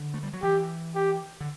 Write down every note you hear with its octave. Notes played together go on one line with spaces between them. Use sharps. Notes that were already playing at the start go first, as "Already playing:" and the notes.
Already playing: D3
A3
G3
F#3
E3 G4
G4
D3